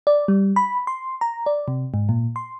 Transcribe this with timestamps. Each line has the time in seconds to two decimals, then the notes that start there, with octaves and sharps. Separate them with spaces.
0.07 D5
0.28 G3
0.56 B5
0.87 C6
1.21 A#5
1.46 D5
1.68 C3
1.94 G#2
2.09 A#2
2.36 C6